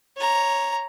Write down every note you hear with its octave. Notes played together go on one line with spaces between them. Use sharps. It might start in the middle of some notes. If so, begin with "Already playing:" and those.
C#5 A#5